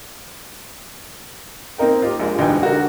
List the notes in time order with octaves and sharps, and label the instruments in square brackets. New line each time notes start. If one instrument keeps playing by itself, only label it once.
[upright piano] A#3 C4 D#4 A#4 G5
F4 G4
A#1 G#3
E1 D2 D#4 B4 G5 G#5
D4 F#4 A4 A#4